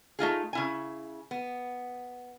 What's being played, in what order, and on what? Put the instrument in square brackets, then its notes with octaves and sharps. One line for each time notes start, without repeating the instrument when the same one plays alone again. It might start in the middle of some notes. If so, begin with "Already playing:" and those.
[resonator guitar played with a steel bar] A3 D#4 F4 G#4
C#3 E4 G#5
B3